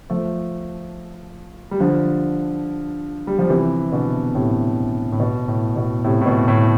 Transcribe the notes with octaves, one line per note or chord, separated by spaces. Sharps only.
F3 A3
G3
D3 F3
G3
F3
C3 E3
B2 D3
A2 C3
A2
B2
A2
B2
A2 C3
A2
B2
A2